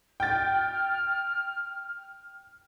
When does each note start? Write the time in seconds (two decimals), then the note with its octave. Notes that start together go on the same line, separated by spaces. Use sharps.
0.20 G5 F6 A6